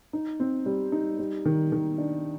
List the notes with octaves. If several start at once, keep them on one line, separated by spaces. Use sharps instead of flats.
D#4
C4
G3
D#4
G3
D#3
D#3
D4